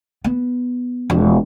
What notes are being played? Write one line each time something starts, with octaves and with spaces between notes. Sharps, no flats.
B3
E1 F2